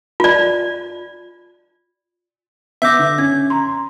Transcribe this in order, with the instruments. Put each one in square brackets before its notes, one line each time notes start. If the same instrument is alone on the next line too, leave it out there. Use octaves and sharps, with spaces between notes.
[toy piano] F4 D5
[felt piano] B3 [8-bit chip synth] E5 D6 [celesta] E6 G6 A#6
[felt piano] D3
[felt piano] C#4 [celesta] G#6
[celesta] A#5 C6